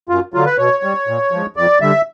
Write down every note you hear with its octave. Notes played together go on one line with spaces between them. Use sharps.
F#2 F4
D3 F#3 F4
B4
B2 C#5
G3
A#2
F3 G#3
F2 D5
D3 G3 E5